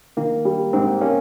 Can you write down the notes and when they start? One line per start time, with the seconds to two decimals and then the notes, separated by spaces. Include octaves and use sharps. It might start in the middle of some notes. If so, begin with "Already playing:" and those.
0.17 D#3 A#3
0.45 G3
0.73 G#2 C4
1.01 A#3 C#4